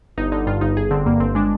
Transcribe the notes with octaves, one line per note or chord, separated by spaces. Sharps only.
G1 D#4
D3 D#4
G2 F4
G1 D#4
G1 G#4
D3 C4
G2 A#3
G1 C4
G#3 D4